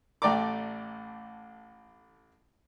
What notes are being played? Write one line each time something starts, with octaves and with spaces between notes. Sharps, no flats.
A1 A3 D5 G5 A#5 D6